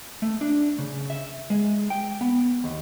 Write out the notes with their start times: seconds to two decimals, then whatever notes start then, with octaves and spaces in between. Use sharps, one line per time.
0.22 A3
0.41 D4
0.78 C#3
1.10 E5
1.50 G#3
1.90 G5
2.21 B3
2.64 D#2